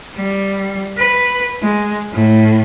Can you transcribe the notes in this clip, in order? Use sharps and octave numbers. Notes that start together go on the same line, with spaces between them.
G3
B4
G#3
A2